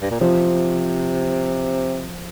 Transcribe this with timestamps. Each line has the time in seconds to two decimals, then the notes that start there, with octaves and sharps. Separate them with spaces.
0.02 G2
0.11 A#2
0.20 C3 F3